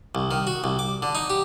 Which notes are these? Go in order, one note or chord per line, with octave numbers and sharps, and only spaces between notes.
C2
D#3
F#4
C2
D6
D3
D#4
G4